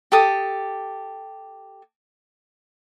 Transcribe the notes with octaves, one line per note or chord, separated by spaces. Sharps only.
G4 A4 D#6